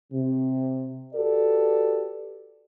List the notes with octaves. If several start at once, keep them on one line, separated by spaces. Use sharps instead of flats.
C3
F#4 G4 A4 B4 D5